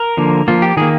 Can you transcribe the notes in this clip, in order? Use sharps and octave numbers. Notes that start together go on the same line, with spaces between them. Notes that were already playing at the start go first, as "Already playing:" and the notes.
Already playing: A#4
D3 F3 A#3
F3 A#3 F4
G4
D#3 A#3 G#4